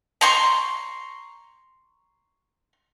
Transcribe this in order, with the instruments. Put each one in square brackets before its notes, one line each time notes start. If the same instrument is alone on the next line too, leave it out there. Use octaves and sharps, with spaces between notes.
[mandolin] A#5 C6 C#6